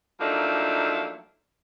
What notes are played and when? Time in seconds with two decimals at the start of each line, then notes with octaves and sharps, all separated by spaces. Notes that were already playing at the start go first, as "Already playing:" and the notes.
0.20 F3 F#3 A3 A#3 D4 D#4